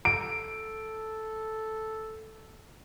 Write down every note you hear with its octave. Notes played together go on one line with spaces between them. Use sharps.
A4 D7